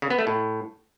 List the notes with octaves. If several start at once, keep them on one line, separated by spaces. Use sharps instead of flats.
C#3
B3
A3
A2